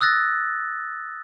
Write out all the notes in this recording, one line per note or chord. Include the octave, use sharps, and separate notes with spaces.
D#6 E6 F#6 A6 A#6